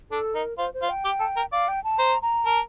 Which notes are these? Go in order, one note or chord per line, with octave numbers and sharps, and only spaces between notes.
D4 A4
D#4 A#4
F4 C5
C5
F4
G5
G4
A4
A#4
D5 F5
G5
A5
C5 A#5
A#5
A#4 A5